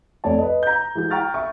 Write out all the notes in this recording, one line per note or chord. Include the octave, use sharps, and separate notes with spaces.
F2 A3 C#5 D5 A5
B4 D#5
A#5 G6
E3 G#3 F#4 G6
G5 A#5 C#6 F6 A6
E5 C#6